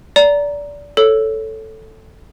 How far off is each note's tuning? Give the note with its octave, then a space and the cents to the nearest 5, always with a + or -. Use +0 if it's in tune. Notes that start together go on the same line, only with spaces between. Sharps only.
D5 -20 A#5 +0
A4 +0 C#5 +0